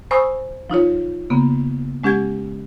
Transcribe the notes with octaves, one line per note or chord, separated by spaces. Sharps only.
C5 G#5 B5 C#6 D#6 E6
F3 D#4 F4 C#5
C#3 A#3 B3
G#3 C#4 G4 F#5 G#6